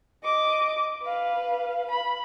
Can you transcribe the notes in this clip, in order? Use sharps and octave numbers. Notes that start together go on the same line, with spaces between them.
D#5 D6
B4 F5
B5